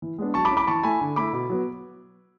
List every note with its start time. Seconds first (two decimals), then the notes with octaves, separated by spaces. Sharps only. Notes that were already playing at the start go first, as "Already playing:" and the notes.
0.02 E3
0.18 G#3 B3 D4
0.34 F#3 A5 C#6
0.45 B5 D6
0.51 C#4 E4
0.57 B5 D6
0.67 E3 A5 C#6
0.83 A3 E4 G#5 B5
1.01 D3
1.16 A3 E4 B5 D6
1.33 B2
1.49 F#3 B3